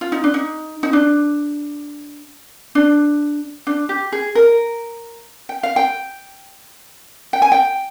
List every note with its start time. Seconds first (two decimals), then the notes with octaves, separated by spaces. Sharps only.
0.01 F4
0.12 D#4
0.24 D4
0.34 D#4
0.83 D#4
0.93 D4
2.75 D4
3.67 D4
3.89 G4
4.12 G#4
4.35 A#4
5.49 G5
5.63 F5
5.76 G5
7.33 G5
7.42 G#5
7.52 G5